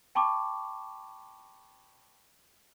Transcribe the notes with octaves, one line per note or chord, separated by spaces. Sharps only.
G5 A5 B5 C#6 D6